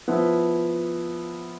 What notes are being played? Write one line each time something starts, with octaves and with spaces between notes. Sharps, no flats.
F3 B3 E4